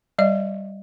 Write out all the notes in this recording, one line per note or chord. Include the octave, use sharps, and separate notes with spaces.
G3 D5 D#5